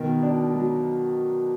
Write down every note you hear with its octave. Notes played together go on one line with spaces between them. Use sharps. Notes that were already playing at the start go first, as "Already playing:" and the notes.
Already playing: B2 D#3 A#4
D4
F#3